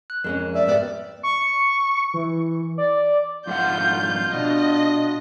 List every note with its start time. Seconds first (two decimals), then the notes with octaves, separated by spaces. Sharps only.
0.10 F#6
0.24 F2 G#3 C#4 A#4
0.54 D5 E5
0.67 G#2 B3 G4 D5
1.23 C#6
2.14 E3
2.78 D5
3.47 F2 G#2 F4 F#5 G6
4.33 B2 D4 D#5